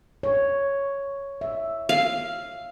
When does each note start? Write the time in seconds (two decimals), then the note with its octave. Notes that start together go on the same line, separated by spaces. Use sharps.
0.23 C#5
1.41 E5
1.89 F5